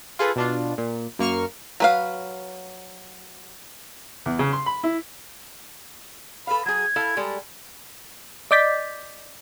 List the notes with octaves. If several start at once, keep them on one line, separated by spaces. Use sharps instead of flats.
F4 G#4 A4 B4
B2 D4 F4
A#2
F#2 A#3 C#6 F6
F#3 B4 F5
E2
C#3
C6
B5
E4
A4 B4 F5 B5
F#3 G#4 G#6
E4 A4 F5
G3 G#3 A4
D5 D#5 D6 G6 A6 B6